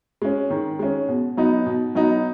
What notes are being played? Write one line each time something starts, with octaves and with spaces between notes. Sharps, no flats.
G#3 C#4
D#3
G#3 C#4
B2
F#3 B3 D#4
B2
F#3 B3 D#4